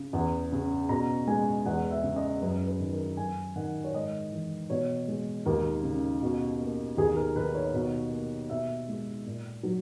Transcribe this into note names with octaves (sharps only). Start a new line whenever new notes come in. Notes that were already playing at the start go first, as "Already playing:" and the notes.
Already playing: C#3
E2
C#3
B2 A#5
G#3 G#5
E2 F#5
E5
C#3
D#5
F#2 B4
B4
D#3
A#4
F#2 G#5
D#3 F#5
C#5
G#2 D#5
E3
B2 C#5
G#3
D#2 A#4
C#3
B2
A#3
D#2 G#4
A#4
D#3 B4
C#5
B2
A#3
B2 E5
G#3
A#2
F#3